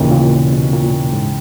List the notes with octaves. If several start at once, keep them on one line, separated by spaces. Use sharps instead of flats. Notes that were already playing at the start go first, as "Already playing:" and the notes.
Already playing: D#2 A#2 C#3 E3
A#2
B2
B2
A#2
G#2